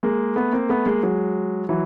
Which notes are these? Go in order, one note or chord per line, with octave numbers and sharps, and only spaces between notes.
G#3 A#3
A3 B3
A#3 C4
A3 B3
G#3 A#3
F#3 G#3
E3 F#3